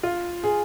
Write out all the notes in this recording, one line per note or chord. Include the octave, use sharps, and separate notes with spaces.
F4
G#4